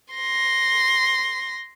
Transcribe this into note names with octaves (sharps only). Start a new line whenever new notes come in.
C6 A#6